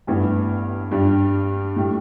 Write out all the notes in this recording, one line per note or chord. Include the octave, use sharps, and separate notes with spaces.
A1 G2 E3 B3
G2 G3 D4
A2 G3